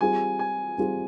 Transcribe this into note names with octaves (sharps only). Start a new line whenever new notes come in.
G3 C4 F4 G#4 G#5
G#5
G3 C4 F4 G#4